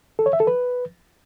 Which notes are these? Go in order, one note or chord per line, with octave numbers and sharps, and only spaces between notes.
A4
C#5
E5
A4
B4